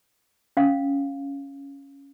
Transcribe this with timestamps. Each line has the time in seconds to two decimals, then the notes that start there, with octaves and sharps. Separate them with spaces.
0.57 C#4 F5